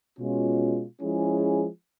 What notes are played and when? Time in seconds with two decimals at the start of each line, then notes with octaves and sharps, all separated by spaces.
0.19 B2 G#3 C#4 F4
1.01 F3 G#3 C#4 E4 G#4